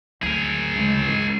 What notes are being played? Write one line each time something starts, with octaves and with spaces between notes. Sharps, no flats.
D2 F#3 G#4 A#4
C#2
C#4